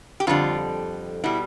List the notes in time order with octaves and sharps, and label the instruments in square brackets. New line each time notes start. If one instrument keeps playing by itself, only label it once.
[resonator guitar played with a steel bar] G4
F2 D3 G3 F4
B2 G3 E4